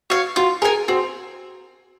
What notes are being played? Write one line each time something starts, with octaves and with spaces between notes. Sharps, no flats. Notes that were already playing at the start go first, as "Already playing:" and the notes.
F#4 C#5 F5
F4 F#4
G#4 A#4 F5 G#5
C4 F#4